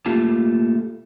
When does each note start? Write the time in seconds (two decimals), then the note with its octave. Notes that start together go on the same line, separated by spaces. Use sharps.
0.06 A3 A#3 F4 G4 A5